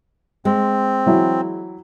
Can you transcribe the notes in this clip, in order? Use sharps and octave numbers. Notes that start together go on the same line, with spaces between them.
G#3 C4
E3 F#3 E4